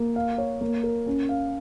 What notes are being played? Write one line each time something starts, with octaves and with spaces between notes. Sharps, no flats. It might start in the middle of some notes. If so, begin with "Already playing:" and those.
Already playing: A#3
F5
C#5
A#3
A#4
C#4
F5